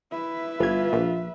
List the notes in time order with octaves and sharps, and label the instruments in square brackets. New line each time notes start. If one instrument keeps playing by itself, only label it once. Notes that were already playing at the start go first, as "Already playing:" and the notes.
[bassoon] E4 [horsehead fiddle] B4 E5
[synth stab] G1 G#6 [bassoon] E3 [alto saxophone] F4
[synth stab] A#1